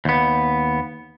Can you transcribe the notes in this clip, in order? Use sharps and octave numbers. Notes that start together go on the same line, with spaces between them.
D#2 B3